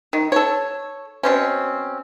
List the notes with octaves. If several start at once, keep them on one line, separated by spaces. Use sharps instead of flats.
D#3
A4 C#5
B2 C4 C#4